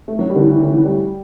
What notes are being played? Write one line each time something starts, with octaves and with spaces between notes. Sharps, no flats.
A3
F#3
G3
D3
E3
E3
D3
E3
G3